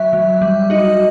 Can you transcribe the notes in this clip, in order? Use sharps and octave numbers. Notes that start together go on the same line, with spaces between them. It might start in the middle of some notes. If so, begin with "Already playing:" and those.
Already playing: F#3 E5
F#3
G3
D#4 F#4 D#5